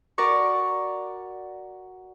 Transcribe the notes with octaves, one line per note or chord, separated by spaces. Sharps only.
F#4 A#4 D5 C#6